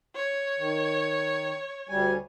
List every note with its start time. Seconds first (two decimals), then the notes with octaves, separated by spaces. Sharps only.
0.16 C#5
0.59 D#3
1.89 D2 G3 G#5